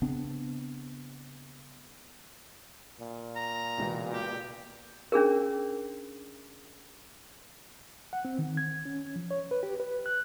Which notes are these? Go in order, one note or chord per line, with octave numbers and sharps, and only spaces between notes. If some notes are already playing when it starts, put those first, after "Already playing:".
C#3 B3 C4 D4
A#2
A#5
C#2 B2 E3
G4
C#4 D4 G#4 A#4
F#5
C4
D#3
G#6
C#4
F3
C#5
B4
G4
B4
F#6